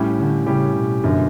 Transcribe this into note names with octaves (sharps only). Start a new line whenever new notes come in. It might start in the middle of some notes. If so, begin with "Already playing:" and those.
Already playing: A2 G3 C#4 G4
D3
A2 C#3 G3 C#4 G4
B2
G1 F#2 D3